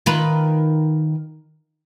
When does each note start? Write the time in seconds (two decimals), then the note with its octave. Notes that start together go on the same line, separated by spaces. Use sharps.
0.06 D#3 F4 B4